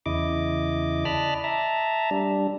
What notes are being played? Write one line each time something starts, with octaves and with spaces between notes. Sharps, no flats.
E2 C#3 E4 D#5 D6
D5 D#5 A5 B5 F6 F#6
E5 A5 A#5
G3 D4